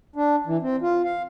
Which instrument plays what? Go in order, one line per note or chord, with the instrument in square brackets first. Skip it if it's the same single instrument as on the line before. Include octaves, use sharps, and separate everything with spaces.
[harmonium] D4
E3
C4
F4
F5